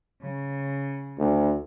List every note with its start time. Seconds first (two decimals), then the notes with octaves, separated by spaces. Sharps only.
0.22 C#3
1.19 D2